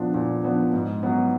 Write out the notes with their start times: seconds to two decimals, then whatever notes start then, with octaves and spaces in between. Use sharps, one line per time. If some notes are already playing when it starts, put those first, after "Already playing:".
Already playing: A#2 F3 B3 D4
0.14 A#2
0.44 F3 B3 D4
0.73 G#2
1.03 F#3 B3